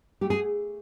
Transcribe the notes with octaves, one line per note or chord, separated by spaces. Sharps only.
A3 G4
G#4